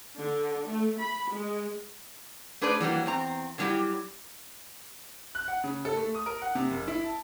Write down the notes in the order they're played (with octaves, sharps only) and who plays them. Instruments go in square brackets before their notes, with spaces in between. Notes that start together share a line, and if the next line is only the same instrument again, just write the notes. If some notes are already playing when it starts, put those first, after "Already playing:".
[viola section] D3
A3
B5
G#3
[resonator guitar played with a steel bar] A3 D4 G#4 B4 C5 D5
E3 F#3 G3 A#3
E2 C4 A#5
D3 F#3 G3 D#4 E4 G4
[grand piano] F#6
F#5
C#3
A4
A3
D#6
A#4
F#5
C3
F#1
E4
A5